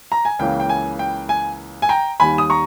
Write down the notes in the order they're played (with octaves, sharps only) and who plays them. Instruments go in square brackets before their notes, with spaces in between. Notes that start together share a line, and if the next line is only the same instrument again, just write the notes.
[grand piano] A#5
G#5
C#2 C#3 E3 A#3 C#4 G5
G5
G#5
G5
G#5
G#5
G5 A#5
D#2 D#3 G3 G#5 B5
D#6
A#5 C#6